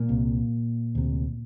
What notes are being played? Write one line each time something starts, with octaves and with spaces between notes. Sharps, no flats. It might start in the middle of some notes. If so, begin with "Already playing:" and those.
Already playing: A#2 A#3
C2 C3
D2 C3